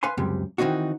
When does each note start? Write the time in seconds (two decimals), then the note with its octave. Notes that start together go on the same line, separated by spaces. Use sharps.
0.03 B4 F5 G#5 C6
0.17 C#2 F#2 C3 G3 G#3
0.58 D#3 E3 G#3 C4 D#4 F#4